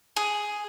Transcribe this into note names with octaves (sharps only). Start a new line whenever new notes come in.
G#4